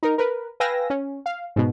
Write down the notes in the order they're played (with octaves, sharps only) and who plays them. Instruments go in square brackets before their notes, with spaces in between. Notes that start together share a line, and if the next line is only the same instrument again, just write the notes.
[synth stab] D#4 A#4
A#4 B4
B4 F5 G5 G#5 E6 A#6
C#4
F5
G#2 B2